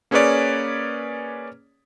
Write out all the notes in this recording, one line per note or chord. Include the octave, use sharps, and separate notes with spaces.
A#3 C#4 G#4 B4 C#5 D5